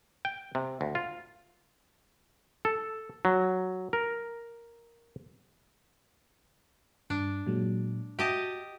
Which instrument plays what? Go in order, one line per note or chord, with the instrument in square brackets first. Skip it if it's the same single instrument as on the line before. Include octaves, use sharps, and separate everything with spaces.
[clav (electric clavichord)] G5
C3
D2
F4
A4
F#3
A#4
[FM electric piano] G2 [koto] D4
[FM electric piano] A#2 F#3 G#3
[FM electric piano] F#4 E5 [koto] G4 D#5 A5